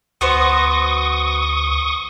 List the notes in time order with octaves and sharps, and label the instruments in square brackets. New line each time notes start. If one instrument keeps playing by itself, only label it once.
[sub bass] D2 [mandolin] B3 F#4 C5 [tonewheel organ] C#6 D#6